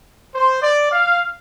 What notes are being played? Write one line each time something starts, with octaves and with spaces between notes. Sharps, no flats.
C5
D5
F5